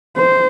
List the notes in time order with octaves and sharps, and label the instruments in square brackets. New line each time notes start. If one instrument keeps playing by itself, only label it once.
[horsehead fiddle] C5